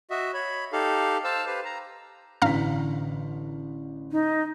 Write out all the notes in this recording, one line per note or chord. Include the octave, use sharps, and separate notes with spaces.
F#4 D#5 E5
C#5 B5
D#4 G4 A4 F5
C5 F5 A5 E6
G4 B4 C5 F5
A#5
A1 D3 F5 A#5 F6 B6
D#4